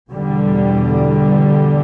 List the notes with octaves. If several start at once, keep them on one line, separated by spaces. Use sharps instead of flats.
E2 B2 D3 G3